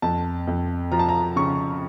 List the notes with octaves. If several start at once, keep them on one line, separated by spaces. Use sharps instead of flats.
F2 A5
F2
F3 A#5
A5
A#5
C#3 C#6